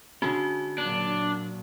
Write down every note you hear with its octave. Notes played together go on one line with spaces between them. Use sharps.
D3 G#3 C#4 F#4
A#2 F#3 D4